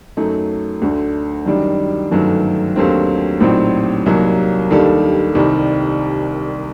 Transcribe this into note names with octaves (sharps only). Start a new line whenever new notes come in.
F#2 F#3 A3 D#4
D2 D3 A3
F#2 D#3 G3 D4
G1 F#2 D#3 F#3 A3
D#2 D3 F#3 A3 C4
A#1 A2 F#3 C4 D#4
C2 C3 F#3 A#3 D#4
D#2 D#3 G3 D4 A4
C2 C3 D#3 G3